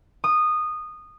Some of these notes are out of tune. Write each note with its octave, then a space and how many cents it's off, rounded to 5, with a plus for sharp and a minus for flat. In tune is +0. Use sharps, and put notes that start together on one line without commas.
D#6 -15